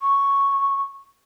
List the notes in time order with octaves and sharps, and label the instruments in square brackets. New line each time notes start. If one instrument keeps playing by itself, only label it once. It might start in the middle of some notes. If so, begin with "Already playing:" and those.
[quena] C#6